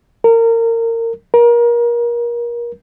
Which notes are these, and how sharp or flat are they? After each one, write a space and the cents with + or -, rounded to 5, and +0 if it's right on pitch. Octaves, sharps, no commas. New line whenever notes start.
A#4 -25
A#4 +30